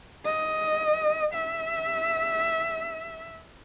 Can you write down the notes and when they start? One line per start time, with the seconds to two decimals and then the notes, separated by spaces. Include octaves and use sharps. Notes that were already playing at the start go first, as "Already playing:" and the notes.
0.25 D#5
1.34 E5